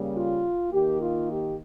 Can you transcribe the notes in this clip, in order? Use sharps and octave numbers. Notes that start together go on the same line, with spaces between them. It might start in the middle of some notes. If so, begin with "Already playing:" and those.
Already playing: C#3 G3 A#3
F4
D#3 A#3 G4
F4
G4